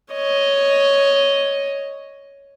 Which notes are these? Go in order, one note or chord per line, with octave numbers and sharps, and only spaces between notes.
C#5 D#5